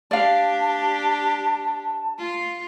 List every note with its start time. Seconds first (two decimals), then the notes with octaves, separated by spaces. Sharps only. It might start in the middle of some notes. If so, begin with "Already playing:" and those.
0.11 D4 G4 D5 F5 A5
2.18 F4